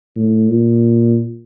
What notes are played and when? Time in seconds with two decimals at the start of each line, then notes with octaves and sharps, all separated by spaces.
0.16 A2
0.49 A#2